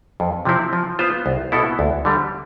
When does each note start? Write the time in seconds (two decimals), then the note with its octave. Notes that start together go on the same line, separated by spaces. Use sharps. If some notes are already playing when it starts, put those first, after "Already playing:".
0.20 F2
0.45 C3 F3 C4 E4
0.73 F3
0.99 B3 F4 C5
1.26 C2
1.52 B2 B3 E4 A4
1.79 D2
2.05 D3 G3